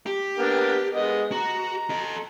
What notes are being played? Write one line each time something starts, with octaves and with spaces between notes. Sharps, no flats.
G4
A#3 B3 D4
G#3 B3 D#5
F#4 A#5
A4 D#5